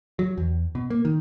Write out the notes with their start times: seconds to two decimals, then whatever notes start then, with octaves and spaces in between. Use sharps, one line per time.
0.19 F#3
0.38 E2
0.75 B2
0.90 A#3
1.05 D#3